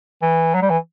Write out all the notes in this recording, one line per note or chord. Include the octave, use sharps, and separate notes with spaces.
E3
F#3
G3
E3